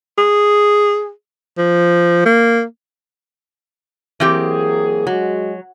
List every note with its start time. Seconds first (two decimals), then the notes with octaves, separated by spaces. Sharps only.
0.18 G#4
1.58 F3
2.26 A#3
4.20 E3 F#3 A#3 C4 G4 G#4
5.07 F#3 G#3 F#4